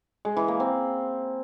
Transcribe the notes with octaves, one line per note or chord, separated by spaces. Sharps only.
G#3
E3
A#3
C4